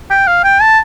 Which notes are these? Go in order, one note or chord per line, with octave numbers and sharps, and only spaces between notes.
G5
F5
G5
A5